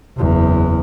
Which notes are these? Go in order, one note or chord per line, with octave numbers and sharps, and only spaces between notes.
F#1 E2